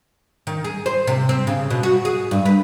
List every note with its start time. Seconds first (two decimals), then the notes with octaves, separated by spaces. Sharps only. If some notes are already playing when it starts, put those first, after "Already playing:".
0.47 D#3
0.64 G#4
0.86 C5
1.07 C3
1.29 C4
1.47 C#3
1.70 B2
1.83 F#4
2.05 G#4
2.31 G2
2.45 B4